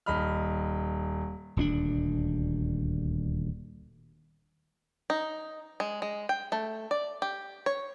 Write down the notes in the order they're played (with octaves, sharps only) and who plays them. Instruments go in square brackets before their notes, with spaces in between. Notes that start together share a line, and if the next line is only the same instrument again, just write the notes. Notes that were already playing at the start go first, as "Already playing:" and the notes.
[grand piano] D#1 D#5 B5 F6
[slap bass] D#1 D2 C4 D4
[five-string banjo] D#4
G#3
G#3
G5
A3
D5
G4
C#5